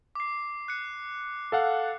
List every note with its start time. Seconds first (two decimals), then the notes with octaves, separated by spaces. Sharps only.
0.15 D6 C7
0.68 F#6 C#7
1.52 A4 F5 F#5